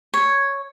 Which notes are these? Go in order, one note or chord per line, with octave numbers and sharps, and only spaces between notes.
C#5